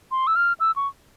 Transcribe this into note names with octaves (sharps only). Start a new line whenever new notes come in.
C6
E6
F6
E6
C#6